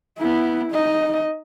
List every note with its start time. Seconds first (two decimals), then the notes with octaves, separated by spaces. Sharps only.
0.18 B3 E4
0.72 D#4 D#5